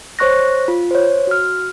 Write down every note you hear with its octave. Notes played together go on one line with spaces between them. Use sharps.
C5 C#5 C#6 F#6 A#6
F4
C5 C#5
F#4 F6